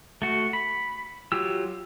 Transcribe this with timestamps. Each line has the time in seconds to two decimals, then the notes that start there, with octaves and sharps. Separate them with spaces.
0.22 A3 F#4
0.53 B5
1.32 F#3 F4 G4 E6